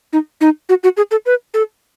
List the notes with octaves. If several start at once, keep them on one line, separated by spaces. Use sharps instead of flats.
D#4
D#4
F#4
F#4
G#4
A4
B4
A4